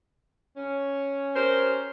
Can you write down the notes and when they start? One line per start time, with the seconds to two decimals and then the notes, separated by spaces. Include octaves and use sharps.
0.57 C#4
1.35 G4 A#4 C5